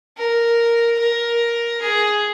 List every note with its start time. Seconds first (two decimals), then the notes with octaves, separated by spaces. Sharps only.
0.17 A#4
0.99 A#4
1.81 G#4